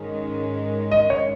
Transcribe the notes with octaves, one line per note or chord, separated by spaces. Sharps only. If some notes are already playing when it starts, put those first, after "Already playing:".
Already playing: G#2 D#3 G#3 C#4
D#5
C#5